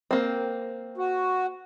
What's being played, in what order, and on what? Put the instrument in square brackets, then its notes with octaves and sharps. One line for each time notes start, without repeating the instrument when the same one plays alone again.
[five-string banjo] A#3 C4
[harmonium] F#4